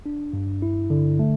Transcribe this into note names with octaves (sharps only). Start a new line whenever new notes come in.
D4
G2
E4
D3
A3